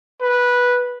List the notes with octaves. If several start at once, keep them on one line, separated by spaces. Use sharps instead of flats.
B4